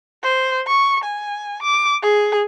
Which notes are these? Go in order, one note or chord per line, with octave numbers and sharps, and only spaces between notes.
C5
C#6
G#5
D6
G#4